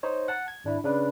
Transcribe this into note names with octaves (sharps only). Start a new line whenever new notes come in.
D#4 C5 C#5
F#5 A5
G#6
G#1 D4 E4
C#3 D4 B4